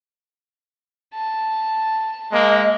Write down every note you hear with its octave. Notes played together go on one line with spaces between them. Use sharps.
A5
G#3 A#3 D#5